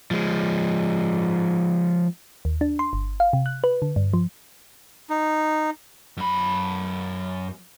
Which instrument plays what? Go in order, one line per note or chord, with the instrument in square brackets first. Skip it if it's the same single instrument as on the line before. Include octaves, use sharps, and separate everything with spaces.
[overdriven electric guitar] F3 G#3
[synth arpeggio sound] D#2
D4
C6
G1
F5
C3
F#6
B4
D3
G2
F3
[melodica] D#4
[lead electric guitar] F#2 B5